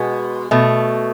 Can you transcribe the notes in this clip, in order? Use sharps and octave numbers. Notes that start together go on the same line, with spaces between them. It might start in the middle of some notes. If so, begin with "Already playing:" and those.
Already playing: B2 G#3 B3
B2 A3